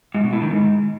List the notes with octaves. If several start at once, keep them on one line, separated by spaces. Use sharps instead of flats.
G#2
B2
A2
D#3
G#2